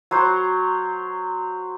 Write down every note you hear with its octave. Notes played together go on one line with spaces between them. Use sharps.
F#3 C5